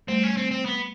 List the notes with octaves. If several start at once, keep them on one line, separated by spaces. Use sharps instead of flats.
G3 A3 C4
C#4
C4
C4
B3